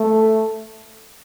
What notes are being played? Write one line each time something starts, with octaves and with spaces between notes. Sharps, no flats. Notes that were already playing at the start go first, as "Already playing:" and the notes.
Already playing: A3